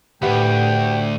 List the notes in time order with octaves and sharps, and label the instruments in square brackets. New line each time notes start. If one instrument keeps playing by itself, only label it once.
[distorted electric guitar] D2 [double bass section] A2 [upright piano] G4 B4 F#5 [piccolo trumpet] G5